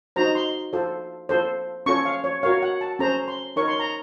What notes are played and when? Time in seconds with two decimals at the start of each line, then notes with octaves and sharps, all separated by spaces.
0.16 D#4 F#4 C5 A#5
0.35 C6
0.73 F4 A4 C5
1.29 F4 A4 C5
1.86 C#4 F4 A4 C#5 C#6
2.05 F5
2.24 C#5
2.43 F#4 A#4 C#5 F5
2.62 F#5
2.81 A5
2.99 C#4 A4 C5 A#5
3.28 C6
3.56 D#4 A#4 C#5 C#6
3.68 C6
3.80 A#5